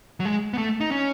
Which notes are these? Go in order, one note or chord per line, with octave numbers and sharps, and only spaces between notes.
F#3
G#3
B3
A3
D#4
C#4